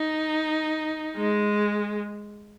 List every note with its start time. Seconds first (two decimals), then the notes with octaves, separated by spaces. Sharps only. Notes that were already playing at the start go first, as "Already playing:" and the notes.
Already playing: D#4
1.17 G#3